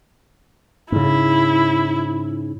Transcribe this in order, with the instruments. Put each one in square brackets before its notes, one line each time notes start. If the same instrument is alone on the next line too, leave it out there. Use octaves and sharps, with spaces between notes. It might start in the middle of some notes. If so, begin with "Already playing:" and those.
[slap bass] G#2 C#3 [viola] E4